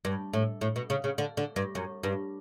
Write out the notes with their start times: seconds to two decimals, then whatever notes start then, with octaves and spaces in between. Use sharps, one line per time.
0.05 G2
0.33 A2
0.61 A2
0.76 B2
0.90 C#3
1.04 C#3
1.18 D3
1.37 D3
1.56 G2
1.75 F#2
2.03 G2